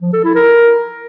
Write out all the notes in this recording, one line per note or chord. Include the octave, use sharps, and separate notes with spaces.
F3
A4
E4
A#4